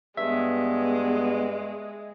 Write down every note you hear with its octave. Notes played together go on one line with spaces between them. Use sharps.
G2 G#3 B3 E5